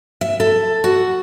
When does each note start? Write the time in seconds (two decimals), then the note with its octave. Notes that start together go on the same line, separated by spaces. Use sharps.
0.21 E5
0.40 A4
0.84 F#4